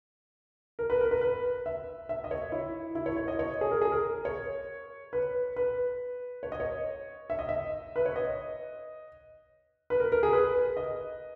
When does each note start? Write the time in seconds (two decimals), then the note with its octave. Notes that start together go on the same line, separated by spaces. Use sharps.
0.79 A#4
0.90 B4
1.01 A#4
1.11 B4
1.21 B4
1.66 E5
2.09 E5
2.24 D#5
2.31 C#5
2.52 E4
2.95 E4
3.06 C#5
3.17 C#5
3.28 D#5
3.39 C#5
3.61 G#4
3.71 A#4
3.81 G#4
3.92 A#4
4.25 C#5
5.13 B4
5.56 B4
6.43 C#5
6.52 D#5
6.60 C#5
7.30 E5
7.39 D#5
7.49 E5
7.96 B4
8.06 C#5
8.16 D#5
9.90 B4
10.00 A#4
10.12 A#4
10.23 G#4
10.33 B4
10.77 D#5